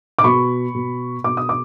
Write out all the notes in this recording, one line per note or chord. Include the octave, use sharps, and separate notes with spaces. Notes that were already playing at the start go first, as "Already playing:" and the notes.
D6
B2 B5 C#6
B2
B2 D6
D#6
D6